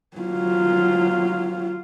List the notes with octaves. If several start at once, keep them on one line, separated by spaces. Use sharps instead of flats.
F#3 F4